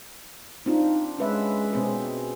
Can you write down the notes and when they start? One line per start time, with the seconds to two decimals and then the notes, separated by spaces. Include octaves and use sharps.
0.66 C4 D4 D#4 F4
1.18 G#3 C#4 B4 E5
1.73 B2 C4 G#4